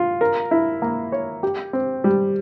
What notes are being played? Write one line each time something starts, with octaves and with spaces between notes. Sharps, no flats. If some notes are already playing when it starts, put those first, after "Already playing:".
Already playing: F4
A#4
E4
A#3
C#5
G4
C4
G3